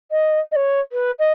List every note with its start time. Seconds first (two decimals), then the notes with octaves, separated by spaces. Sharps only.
0.11 D#5
0.51 D#5
0.55 C#5
0.92 B4
1.19 D#5